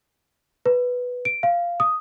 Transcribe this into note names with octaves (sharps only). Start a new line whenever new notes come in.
B4
D7
F5
D#6